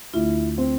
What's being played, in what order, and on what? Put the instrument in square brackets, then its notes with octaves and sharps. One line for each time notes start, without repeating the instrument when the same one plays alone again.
[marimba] D2 D3 A3 D4 F4 [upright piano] E4
[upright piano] C4